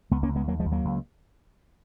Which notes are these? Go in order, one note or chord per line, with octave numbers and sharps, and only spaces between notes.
C#2 G#3 B3
A#3 C#4
C#2
G#3 B3
D#2 F#3 A#3
F3 G#3
D#2
F#3 A#3
C#2